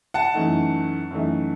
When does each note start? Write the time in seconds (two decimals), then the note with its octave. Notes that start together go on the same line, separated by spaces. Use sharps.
0.14 F#5 A5
0.34 F#2 E3 A3 D#4
1.11 F#2 E3 A3 D#4